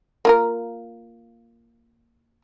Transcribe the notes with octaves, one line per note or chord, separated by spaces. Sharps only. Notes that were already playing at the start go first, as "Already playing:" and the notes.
A#3 F4 A#4